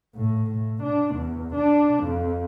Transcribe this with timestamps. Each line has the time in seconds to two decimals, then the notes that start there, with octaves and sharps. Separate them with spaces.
0.15 A2
0.50 A2
0.82 D4
1.15 E2
1.54 D4
2.03 F2